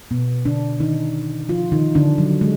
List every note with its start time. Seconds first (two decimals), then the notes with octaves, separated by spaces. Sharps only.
0.11 B2 B3
0.45 D3 D4
0.80 D#3 D#4
1.49 F3 F4
1.72 D#3 D#4
1.95 D3 D4
2.18 F#3
2.41 G#3